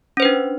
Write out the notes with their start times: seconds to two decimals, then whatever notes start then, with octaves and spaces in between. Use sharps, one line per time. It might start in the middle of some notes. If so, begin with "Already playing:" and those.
0.17 C#4
0.20 C5
0.22 B4
0.25 D4